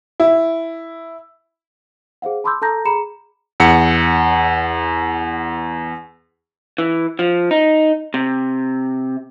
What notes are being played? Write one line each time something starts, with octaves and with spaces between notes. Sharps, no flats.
E4
G#4 C5 F5 F#5
A5 B5 C6 D6 E6 G6
A4 A5 A#5 G6 A#6
G#4 A#5 B5 C#7 E7
E2 F#5 C#7
E3
F3
D#4
C3